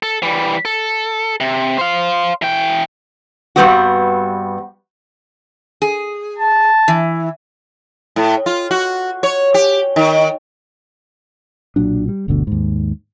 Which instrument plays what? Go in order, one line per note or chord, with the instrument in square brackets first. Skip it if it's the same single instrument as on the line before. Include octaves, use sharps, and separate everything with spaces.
[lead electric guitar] A4
E3 G3
A4
C3
C5 F5
E3 G5
[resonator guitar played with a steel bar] G2 C#3 G3 B3 C4 F#4
G#4
[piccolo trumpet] A5
[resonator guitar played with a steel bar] E3
[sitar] A2
F4
F#4
C#5
G4
D#3
[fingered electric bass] B1 A#2 F#3 D4
G3
G1 D2 B2 D3
D#2 G#2